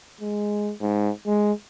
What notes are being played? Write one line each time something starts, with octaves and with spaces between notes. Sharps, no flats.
G#3
G#2
G#3